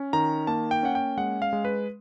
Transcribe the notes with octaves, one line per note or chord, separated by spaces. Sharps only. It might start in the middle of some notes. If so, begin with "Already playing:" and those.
Already playing: C#4
D#3 A#5
A#3 A5
G5
C#4 F#5
G5
G#3 F#5
F5
G#3
B4